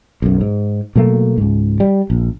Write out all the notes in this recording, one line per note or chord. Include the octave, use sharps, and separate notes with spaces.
B1 F#2
G#2
B2 F#3 A3 A#3
C#2 G#2
G3
A#1